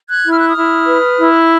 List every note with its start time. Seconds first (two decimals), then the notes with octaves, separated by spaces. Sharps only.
0.09 F#6 G#6
0.24 E4
0.32 F6
0.40 F#6
0.48 D#6 F6
0.56 E4
0.86 B4
1.18 E4